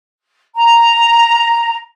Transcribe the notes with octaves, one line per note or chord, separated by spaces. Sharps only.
A#5